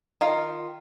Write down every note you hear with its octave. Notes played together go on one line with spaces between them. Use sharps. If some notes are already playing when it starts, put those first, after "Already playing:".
D#3 F4 F5